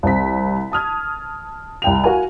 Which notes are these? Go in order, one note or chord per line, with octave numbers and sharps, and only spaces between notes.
C2 C4 B6
A5 D#6 F6 G#6
C2 G5 F7
F#4 A#4 F5 G#5